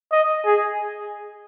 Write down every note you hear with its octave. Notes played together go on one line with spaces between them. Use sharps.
D#5
G#4